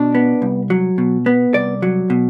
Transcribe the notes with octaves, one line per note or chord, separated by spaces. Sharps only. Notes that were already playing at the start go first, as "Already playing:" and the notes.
Already playing: B2 D4
B3
C2
F#3
B2
B3
C2 D5
F#3
B2